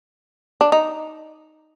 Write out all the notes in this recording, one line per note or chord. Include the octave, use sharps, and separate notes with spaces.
D4
D#4